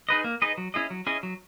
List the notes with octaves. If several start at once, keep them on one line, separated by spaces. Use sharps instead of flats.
D#4 G#4 B4 D#5
A#3
D#4 G#4 B4 D#5
F#3
C#4 E4 G#4 D#5
F#3
C#4 E4 G#4 D#5
F#3